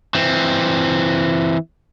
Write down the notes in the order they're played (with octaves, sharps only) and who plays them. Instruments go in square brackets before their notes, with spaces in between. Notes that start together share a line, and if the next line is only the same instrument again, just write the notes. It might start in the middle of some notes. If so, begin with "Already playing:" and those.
[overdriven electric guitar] E3 C4